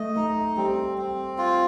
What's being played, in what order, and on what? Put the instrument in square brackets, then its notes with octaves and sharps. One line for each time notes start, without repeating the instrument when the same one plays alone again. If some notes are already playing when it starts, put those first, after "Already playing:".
Already playing: [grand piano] A3 [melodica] D#5
[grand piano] A3 [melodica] D#4
[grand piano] G3 [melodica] C4
[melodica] C4
F4